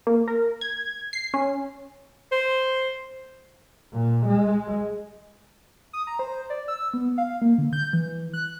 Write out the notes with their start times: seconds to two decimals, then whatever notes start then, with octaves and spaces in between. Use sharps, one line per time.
0.07 A#3
0.28 A#4
0.61 G#6
1.13 C7
1.34 C#4
2.32 C5
3.93 A#2
4.26 G#3
5.93 D#6
6.07 A#5
6.19 C5
6.50 D5
6.68 E6
6.94 B3
7.18 F5
7.42 A#3
7.58 D3
7.73 G6
7.93 E3
8.34 F#6